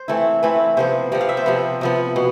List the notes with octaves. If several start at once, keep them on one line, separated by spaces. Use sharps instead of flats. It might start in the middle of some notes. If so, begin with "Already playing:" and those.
Already playing: C5
E3 A3 C4 E4
E3 A3 C4 E4 B4
C3 F3 B3 C5
C3 F3 B3 D5
F5
E5
C5
C3 F3 B3
C3 F3 B3
B2 B3